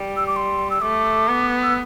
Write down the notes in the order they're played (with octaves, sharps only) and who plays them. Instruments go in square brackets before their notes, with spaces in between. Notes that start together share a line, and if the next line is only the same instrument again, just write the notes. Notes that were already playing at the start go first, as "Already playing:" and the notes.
Already playing: [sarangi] G3
[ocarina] E6
D6
C6
E6
[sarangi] A3 [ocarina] D6
[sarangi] B3
[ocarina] E6